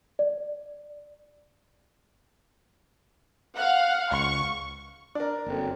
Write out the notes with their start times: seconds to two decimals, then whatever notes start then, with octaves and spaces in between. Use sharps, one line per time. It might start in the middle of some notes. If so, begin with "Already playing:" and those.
0.19 D5
3.56 F5 F#5
4.11 C#2 C#6
5.15 D4 A#4 D5
5.46 F#1 F#2 D3 C4